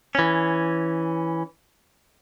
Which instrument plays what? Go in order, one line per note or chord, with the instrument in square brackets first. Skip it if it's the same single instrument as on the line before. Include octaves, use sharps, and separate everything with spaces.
[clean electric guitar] E3 C#4